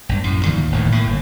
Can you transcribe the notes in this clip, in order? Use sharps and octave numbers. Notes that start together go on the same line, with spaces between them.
A#1 G2
F#2 A2
D2 A#2 D#3 E3
E1 A2 D#3
A2 A#3
G1